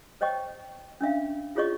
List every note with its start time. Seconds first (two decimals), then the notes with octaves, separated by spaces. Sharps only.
0.21 C5 C#5 D#5 G5 C#6
1.01 C#4 D4 E5 F5
1.55 E4 F4 G#4 C#5 D#5 C#6